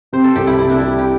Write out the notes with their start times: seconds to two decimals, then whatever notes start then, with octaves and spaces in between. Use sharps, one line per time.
0.13 C3 C5
0.24 A4
0.36 C2 G4
0.47 E4
0.58 C3 E4
0.70 D4
0.80 G3 E4
0.99 G4